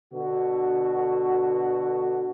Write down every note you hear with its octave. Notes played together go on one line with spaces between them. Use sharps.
B2 D3 F#4